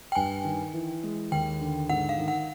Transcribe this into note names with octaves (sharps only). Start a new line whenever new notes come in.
G5
G2 G#5
D#3
E3
G#3
D#2 G5
D3
G#2 F#5
F5
D#3
F#5